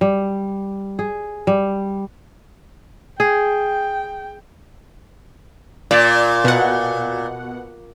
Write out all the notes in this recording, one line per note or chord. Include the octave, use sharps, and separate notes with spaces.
G3
G#4
G3
G#4 G5
A#2 D5
B2 F#5